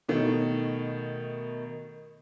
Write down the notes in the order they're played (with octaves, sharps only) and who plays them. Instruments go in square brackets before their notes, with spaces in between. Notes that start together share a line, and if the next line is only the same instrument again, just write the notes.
[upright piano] B2 D#3 A3